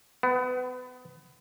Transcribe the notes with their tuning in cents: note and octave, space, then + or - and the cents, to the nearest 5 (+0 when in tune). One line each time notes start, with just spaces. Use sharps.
B3 +30